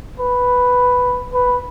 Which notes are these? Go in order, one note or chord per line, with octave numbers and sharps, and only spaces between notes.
B4
B4